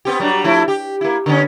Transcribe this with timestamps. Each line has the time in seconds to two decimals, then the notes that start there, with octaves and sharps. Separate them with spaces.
0.05 B3 C4 G4
0.20 F#3 G3 D4
0.44 F3 A3 E4
0.68 G4
1.01 A#3 E4
1.26 D3 B3 C#4